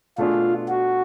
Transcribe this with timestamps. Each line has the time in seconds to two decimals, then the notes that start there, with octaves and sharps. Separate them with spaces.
0.18 B2 A3 D4 F4 G#4
0.69 F#4